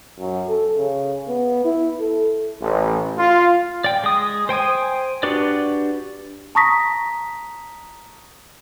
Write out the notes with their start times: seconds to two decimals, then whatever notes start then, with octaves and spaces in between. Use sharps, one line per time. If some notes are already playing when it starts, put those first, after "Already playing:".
0.20 F#2
0.49 A4
0.77 C#3
1.29 B3
1.65 E4
2.00 A4
2.61 A1
3.18 F4
3.84 D5 G5
4.04 G#3 D#6
4.49 C5 G5 G#5 D#6
5.23 D4 F#4 G4 B4 D5
6.55 A5 A#5 C#6 D#6 A#6 B6